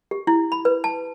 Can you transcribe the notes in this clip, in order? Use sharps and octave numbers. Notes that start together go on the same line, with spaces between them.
G4
E4
B5
B4
A5